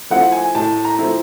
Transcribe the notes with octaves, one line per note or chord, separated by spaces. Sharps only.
F3 A3 C4 E4 F#5
G#5
A2 A5
A#5
F3 A3 C4 E4